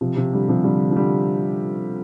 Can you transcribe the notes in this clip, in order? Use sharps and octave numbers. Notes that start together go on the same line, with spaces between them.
C3 F3
C3 F3
D3 G3
C3 F3
D3 G3
F3
D3 G3